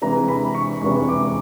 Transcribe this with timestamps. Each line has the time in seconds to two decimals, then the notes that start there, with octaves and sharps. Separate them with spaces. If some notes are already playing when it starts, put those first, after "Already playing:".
0.02 C3 E3 G#3 A#5
0.28 B5
0.55 C#6
0.82 C3 E3 G#3 C#6
1.09 D6